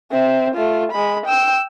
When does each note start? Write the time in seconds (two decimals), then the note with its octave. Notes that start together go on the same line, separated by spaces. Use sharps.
0.11 C4 E5
0.54 A3 F4
0.92 G#3 B5
1.26 G5 E6